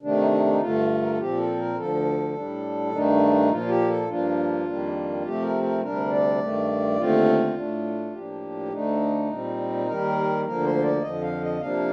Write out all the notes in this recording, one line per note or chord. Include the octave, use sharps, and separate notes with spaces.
C3 D#3 A3 D4
D#4
D#4
D#4
G2 D3 A3 F4
A#4
A4
A#2 F3 C4 G4
A4
A#4
D2 D3 F3 A4
A2 G3 D4
G2 D#3 A3 D4 D#4
A#2 F3 A#3 F4
G4
A4
G2 F3 A#3 D4 F4
F2 D#3 G3 A#3 D4
C3 F3 A3 C4 G4
A#4
A#4
D2 C3 G3 D4 A#4
D5
G2 D#3 A3
D#2 D3 A3 C4 F4
A2 A3 D4
A2 F3 A#3 D4 G4
D2 D3 A3 D4 D#4
A#2 G3 C4
D#2 D#3 G3 A#4
D2 D3 F3 A#3 A#4
C5
D5
F2 D3 F3 D#5
F5
D#5
C3 F3 A#3 D4 F5